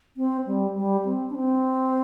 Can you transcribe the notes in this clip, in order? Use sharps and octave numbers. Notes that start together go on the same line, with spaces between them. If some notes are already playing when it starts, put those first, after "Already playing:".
C4
G3
G3
C4
D4
C4